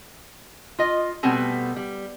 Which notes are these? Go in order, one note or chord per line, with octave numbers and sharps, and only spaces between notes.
F4 D#5
B2 G3 A3 B3 C4 G#5
G3